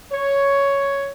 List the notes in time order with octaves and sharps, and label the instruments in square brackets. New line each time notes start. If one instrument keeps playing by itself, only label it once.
[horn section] C#5